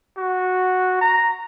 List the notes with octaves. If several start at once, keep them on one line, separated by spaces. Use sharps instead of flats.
F#4
A#5